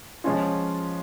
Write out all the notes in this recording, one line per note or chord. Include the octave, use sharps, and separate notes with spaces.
F3 G#3 C#4 F4